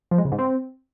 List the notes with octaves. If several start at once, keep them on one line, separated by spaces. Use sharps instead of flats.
F3
G#3
C#3
G#2
C4